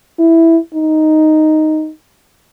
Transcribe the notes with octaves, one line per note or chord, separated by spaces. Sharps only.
E4
D#4